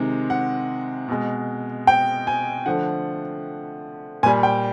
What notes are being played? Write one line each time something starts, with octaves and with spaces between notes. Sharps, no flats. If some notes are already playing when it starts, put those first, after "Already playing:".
Already playing: C3 D#3 G#3
F#5
B2 G#3
G5
G#5
D3 F3 A3 F#5
A#2 G3 G#5
G5